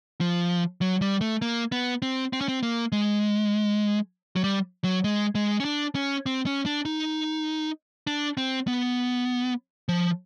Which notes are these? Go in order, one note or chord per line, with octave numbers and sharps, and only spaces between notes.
F3
F#3
G3
A3
A#3
B3
C4
C4
C#4
C4
A#3
G#3
F#3
G3
F#3
G#3
G#3
C#4
D4
C#4
C4
C#4
D4
D#4
D4
C4
B3
F3